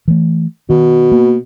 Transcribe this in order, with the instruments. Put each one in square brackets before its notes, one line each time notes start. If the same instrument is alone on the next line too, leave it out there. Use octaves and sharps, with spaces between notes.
[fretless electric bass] E3 A3
[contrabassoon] B2 [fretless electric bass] D#3
[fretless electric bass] A#3